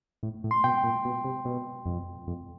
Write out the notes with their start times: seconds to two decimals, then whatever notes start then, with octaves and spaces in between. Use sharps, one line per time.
0.23 A2
0.44 A2
0.51 C6
0.64 B2 G5
0.84 A#2
1.05 B2
1.24 C3
1.45 B2
1.86 F2
2.27 F2